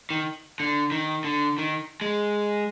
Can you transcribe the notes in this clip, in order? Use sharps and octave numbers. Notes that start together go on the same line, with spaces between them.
D#3
D3
D#3
D3
D#3
G#3